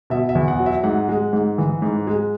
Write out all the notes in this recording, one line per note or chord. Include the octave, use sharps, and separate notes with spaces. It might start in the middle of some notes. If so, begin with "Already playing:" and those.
B2 E5
E5
E2
F#5
F#3
E5
G#2 F#5
G#3
G#2
E3
G#2
G#3